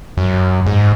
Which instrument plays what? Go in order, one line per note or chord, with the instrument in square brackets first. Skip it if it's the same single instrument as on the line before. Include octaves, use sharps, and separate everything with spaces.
[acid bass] F#2
G#2